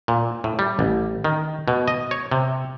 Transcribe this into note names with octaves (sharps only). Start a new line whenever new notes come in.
A#2
A2
G3
A1
D#3
B2
D#5
C#5
C3